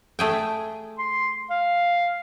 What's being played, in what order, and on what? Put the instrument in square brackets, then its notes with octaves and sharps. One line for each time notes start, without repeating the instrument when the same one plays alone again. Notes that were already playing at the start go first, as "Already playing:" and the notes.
[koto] A3 G#4 G5
[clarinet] C6
F5